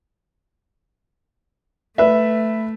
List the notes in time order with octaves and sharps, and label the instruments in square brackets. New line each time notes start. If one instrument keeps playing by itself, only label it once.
[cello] A3 [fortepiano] B4 E5